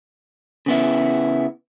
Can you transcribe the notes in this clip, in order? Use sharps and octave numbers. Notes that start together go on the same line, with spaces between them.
C#3 B3 E4